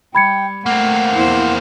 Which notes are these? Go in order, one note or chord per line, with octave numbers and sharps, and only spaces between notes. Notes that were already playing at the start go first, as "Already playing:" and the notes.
G3 G5 B5 G#6 C#7
A3 A#3 C4 F#5
E2 E4 C5